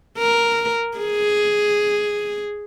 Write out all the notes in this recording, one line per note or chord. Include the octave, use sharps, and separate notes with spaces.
A#4
G#4